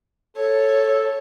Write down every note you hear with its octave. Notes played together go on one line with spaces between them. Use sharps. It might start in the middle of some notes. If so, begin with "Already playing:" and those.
A4 C#5